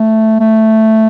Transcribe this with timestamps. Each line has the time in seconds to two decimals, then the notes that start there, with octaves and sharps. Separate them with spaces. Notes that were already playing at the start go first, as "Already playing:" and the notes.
Already playing: A3
0.40 A3